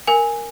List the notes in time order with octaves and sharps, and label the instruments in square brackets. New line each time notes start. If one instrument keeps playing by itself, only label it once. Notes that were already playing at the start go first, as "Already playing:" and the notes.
[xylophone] A#4 G#5